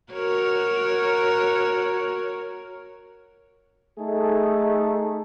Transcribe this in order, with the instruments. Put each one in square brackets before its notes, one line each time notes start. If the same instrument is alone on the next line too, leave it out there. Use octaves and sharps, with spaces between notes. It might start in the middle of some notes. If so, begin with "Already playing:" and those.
[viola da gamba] F#4 A#4 C#5
[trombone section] A3 D#4 G#4 A4